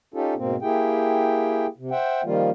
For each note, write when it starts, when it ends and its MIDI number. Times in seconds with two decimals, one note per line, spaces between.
0.14 0.34 61
0.14 0.34 63
0.14 0.34 65
0.14 0.34 67
0.14 0.34 69
0.37 0.56 44
0.37 0.56 47
0.37 0.56 58
0.37 0.56 60
0.62 1.67 58
0.62 1.67 64
0.62 1.67 67
0.62 1.67 68
0.62 1.67 79
1.78 1.90 48
1.91 2.22 72
1.91 2.22 76
1.91 2.22 78
1.91 2.22 79
2.24 2.50 51
2.24 2.50 53
2.24 2.50 55
2.24 2.50 58
2.24 2.50 65